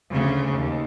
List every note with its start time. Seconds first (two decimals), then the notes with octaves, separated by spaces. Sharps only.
0.12 D2 C#3
0.54 D#2